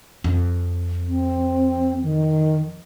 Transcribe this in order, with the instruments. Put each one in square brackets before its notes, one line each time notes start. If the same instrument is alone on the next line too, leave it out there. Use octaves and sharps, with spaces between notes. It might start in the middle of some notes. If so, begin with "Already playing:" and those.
[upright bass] F2
[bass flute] C4
D#3